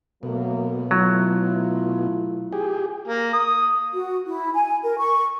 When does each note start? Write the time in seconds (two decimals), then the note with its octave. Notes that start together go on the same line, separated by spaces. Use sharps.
0.23 B2 F#3 A3 A#3
0.91 F#3 A3 E4 F4
2.53 G4 G#4
3.08 A#3
3.33 D#6
3.93 F#4
4.27 E4
4.54 G#5
4.83 A#4
4.98 C#6